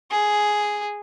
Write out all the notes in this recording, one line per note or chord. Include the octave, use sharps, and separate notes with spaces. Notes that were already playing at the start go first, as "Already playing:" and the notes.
G#4